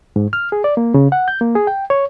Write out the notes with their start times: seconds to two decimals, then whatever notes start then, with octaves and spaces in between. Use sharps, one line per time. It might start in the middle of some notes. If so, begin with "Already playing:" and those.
0.16 G#2
0.33 F6
0.52 G#4
0.64 D5
0.77 A#3
0.94 C#3
1.12 F#5
1.28 G6
1.41 A#3
1.55 G#4
1.67 G5
1.90 C#5